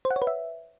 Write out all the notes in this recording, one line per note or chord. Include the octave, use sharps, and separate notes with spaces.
C5
F#5
C#5
B4
E5